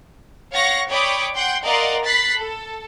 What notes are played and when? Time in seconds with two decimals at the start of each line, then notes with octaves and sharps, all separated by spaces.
0.54 C#5 F5 F#5 C#6 A#6 C#7
0.90 C#5 D5 G5 B5 D6 D#6
1.35 F#5 G5 C6 G6
1.64 A#4 D5 D#5 F5 F#5 C6
2.05 B5 F#6 A6 B6 C7
2.35 A4